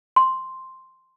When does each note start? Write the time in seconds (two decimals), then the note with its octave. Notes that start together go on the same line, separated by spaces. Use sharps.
0.16 C6